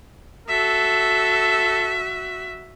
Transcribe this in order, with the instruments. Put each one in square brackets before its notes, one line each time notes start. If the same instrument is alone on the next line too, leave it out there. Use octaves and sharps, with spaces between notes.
[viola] F#4 E5 [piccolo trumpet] A4